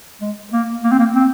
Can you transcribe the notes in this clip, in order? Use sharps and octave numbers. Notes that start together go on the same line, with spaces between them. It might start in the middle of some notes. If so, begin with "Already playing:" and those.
G#3
A#3
A#3
C4
A#3
C4